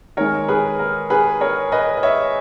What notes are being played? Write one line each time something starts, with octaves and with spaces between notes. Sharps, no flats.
D#3 G#3 A#4 C#5
G#4 B4
A#4
G#4 B4
A#4 C#5
B4 D#5
D#5
C#5 E5